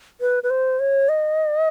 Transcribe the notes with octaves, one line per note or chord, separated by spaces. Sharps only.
B4
B4
C5
C#5
D#5